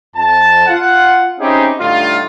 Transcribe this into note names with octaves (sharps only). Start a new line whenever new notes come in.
F2 A5
F4 F#5
C4 C#4 D#4 E4 G4 G#4
A2 D3 G3 D#4 F4